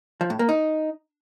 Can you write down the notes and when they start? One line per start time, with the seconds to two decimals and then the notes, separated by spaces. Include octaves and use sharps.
0.21 F3
0.30 A2
0.39 A#3
0.49 D#4